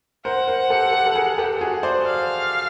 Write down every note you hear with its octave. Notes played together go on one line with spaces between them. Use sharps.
A#4 C5 F#5
A#4 C5
G4 A4
G4 A4
A4
G#4 A#4
G4 A4
F#4 G#4
C5 D5
F5